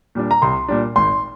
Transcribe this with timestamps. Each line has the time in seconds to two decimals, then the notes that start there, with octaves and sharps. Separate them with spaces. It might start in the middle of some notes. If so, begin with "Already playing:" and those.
0.15 A#2 G3 D4
0.31 A#5
0.42 C2 C6
0.68 A#2 G3 D4
0.96 G#1 C6